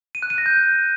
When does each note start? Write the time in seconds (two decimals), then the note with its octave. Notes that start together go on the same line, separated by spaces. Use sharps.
0.15 D#7
0.22 F#6
0.30 D#7
0.38 A#6
0.46 G6